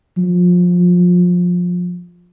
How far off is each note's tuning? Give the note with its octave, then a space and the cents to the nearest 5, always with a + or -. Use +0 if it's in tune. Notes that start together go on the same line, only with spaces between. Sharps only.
F3 +25